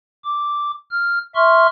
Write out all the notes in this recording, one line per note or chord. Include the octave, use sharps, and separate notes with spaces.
D6
F6
E5 C6 C#6 F6